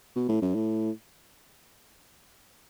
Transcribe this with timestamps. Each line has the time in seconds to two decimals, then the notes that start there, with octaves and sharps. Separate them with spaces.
0.16 B2
0.29 A2
0.42 F#2
0.55 A2